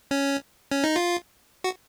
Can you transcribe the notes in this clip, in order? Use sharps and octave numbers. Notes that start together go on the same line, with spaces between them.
C#4
C#4
D#4
F4
F#4